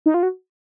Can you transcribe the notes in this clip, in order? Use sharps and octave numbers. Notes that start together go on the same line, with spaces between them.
D#4
F4
F#4